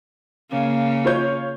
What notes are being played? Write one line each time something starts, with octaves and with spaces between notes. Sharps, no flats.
C#3 A#3
F4 C#5 G6